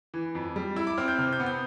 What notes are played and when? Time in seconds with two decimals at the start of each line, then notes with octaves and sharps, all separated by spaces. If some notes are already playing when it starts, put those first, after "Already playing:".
0.14 E3
0.35 F2
0.56 G3
0.76 E4 E6
0.87 D6
0.98 C4 F6
1.08 G6
1.19 C3 F6
1.33 G6
1.40 B3
1.46 G6